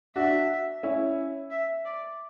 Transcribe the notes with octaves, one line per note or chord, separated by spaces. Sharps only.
D4 F#4 E5
C#4 E4
E5
D5